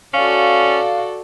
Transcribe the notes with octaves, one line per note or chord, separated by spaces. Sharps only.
C#4 F#4 A4 D5 F5